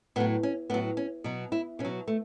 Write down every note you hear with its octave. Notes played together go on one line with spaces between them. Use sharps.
A2 F#3 B3
C#4
A2 F#3 B3
C#4
B2 F#3
E4
B2 C#4
F#3
A3